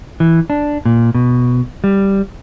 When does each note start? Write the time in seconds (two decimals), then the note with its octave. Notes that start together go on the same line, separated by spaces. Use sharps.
0.20 E3
0.50 D4
0.85 A#2
1.15 B2
1.84 G3